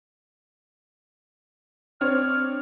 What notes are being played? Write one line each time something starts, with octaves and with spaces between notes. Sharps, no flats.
C4 D4 C#5 F6